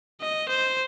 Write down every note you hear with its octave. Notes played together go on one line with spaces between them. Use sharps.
D#5
C5